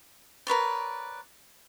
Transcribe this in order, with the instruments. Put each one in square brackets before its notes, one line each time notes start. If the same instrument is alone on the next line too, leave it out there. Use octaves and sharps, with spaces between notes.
[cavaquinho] A#4 B4 C#5 D5